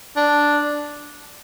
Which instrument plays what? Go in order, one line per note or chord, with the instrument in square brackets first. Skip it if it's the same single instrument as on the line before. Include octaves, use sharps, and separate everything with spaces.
[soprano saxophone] D4